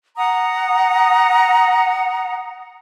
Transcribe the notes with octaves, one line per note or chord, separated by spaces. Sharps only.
F#5 A#5 D#6